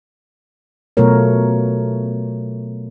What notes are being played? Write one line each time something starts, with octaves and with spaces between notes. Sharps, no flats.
B2 F#3 A3 F4 A#4 C#5